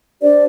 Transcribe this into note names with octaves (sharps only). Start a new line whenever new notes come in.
D4 G4 C5 D5